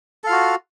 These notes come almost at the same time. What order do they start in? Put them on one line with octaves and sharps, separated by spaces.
A4 F5 F4 F#4